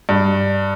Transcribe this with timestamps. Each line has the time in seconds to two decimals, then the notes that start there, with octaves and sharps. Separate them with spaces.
0.09 G2